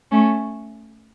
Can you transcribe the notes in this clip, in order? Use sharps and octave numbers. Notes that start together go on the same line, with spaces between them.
A3 C#4